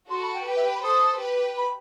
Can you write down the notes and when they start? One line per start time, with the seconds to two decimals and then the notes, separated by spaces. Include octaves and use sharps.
0.10 F#4 A4 C6
0.22 B5
0.34 G5
0.47 G4 B4 G5
0.56 E5
0.65 G5
0.75 B5
0.84 A4 C5 D#6
1.20 G4 B4
1.57 B5